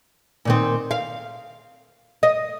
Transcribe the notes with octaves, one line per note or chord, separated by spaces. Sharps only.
A#2 D#3 C4
F5
D#5